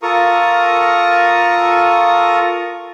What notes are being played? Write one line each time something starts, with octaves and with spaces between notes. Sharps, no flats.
F4 A4 A#4 A#5 C#6 D#6